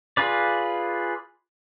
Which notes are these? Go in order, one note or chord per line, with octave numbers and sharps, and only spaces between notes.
F4 G#4 B4 D5